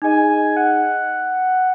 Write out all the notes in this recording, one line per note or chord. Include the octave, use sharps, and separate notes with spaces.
D#4 G#4 D#5 G#5
G#5
F#5